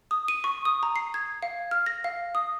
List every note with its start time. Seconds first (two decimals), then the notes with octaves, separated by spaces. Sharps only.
0.11 D#6
0.28 D#7
0.44 C#6
0.65 D#6
0.83 A#5
0.96 C7
1.14 G#6
1.43 F5
1.71 F6
1.86 A#6
2.04 F5
2.35 D#6